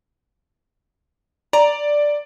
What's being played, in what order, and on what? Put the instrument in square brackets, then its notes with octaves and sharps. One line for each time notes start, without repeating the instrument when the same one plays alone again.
[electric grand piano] D5 [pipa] A#5